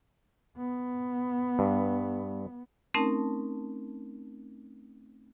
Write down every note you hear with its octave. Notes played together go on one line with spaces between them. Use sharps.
B3
G2
A3 C4 C#4 D#4 A#4 A5